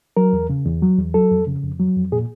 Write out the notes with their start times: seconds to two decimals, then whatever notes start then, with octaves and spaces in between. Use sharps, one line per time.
0.17 F#3 A#4
0.33 E2
0.50 C#3
0.66 E2
0.82 F#3
0.98 E2
1.14 F#3 A4
1.31 F2
1.47 C#3
1.63 F2
1.80 F#3
1.96 F2
2.12 A#2 G#4